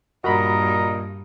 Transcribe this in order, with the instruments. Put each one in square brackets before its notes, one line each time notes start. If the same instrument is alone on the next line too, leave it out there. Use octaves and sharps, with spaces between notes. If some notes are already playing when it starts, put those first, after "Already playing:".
[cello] G2 [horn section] A#2 A#4 D#5 [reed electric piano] F#4 A#5 B5